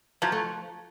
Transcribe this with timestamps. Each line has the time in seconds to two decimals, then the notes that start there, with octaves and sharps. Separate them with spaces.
0.22 F3 F#3
0.32 A3